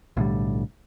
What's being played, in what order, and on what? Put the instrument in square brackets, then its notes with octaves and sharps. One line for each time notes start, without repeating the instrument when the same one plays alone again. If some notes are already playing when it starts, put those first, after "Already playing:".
[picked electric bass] B1 A2 D3 G3